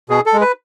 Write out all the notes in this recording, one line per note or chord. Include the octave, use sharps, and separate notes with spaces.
B2 G#4
A4
G#3
B4